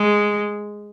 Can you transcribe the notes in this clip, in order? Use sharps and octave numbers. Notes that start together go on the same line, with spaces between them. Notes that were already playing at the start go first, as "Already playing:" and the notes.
Already playing: G#3